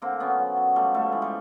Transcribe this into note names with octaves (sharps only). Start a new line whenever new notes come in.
D3 A#3 C4
F#2 B3 C#4
F#3
F#3
F3 G3 A3
G#2 G3 A3
E3 G#3
G3